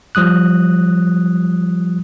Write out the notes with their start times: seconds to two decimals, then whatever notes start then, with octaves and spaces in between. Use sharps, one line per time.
0.15 F3 G3 D#6 F#6